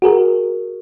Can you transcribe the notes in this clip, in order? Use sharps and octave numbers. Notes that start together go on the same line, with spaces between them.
F#4 G#4 A#4